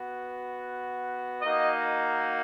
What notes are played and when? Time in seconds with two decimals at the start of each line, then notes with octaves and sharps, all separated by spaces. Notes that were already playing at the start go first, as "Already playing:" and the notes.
Already playing: B3 F#4
1.42 A#3 D#4 F#4 D#5